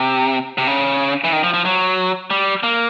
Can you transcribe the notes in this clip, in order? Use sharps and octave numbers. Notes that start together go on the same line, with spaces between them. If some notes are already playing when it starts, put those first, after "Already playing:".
Already playing: C3
C3
C#3
E3
D#3
F3
F3
F#3
G3
A#3